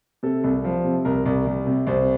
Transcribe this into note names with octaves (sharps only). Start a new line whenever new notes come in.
C3 A4
C2
F3
C3
C2 A#4
C2
C2
C3
C2 C5